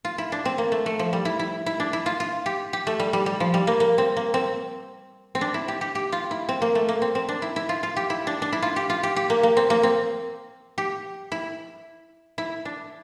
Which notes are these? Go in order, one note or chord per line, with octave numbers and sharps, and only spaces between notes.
F4
E4
D4
C4
A#3
A3
A3
F3
G3
E4
E4
E4
D4
E4
F4
F4
G4
G4
A3
G3
G3
G3
F3
G3
A#3
A#3
C4
A#3
C4
C4
D4
E4
G4
G4
G4
F4
E4
C4
A#3
A3
A#3
C4
C4
D4
E4
E4
F4
F4
G4
E4
D4
D4
E4
F4
G4
F4
G4
G4
A#3
A#3
C4
A#3
C4
G4
E4
E4
D4